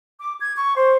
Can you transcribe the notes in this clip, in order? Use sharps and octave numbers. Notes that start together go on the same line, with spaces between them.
D6
G#6
C#6
C5